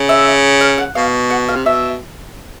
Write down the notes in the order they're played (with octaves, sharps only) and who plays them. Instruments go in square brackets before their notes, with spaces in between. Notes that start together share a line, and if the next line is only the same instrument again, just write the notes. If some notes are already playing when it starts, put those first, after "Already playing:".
Already playing: [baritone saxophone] C#3
[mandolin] E5
F5
F#5
[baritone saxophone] B2 [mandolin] F5
[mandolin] F#5
F5
[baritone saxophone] C3
[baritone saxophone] B2 [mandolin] E5